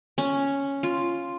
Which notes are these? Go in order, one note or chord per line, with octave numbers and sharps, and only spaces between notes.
C#4
F4